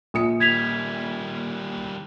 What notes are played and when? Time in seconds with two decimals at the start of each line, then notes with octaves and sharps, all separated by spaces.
0.14 A#1 D#6 C#7
0.40 D#3 G3 G#6 B6 F7